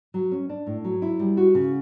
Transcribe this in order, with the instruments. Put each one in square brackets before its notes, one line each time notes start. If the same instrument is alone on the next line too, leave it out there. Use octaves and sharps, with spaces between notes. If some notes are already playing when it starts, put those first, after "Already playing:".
[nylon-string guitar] F#3
C#4
D4
A2
F#3
E4
G3
F#4
C#3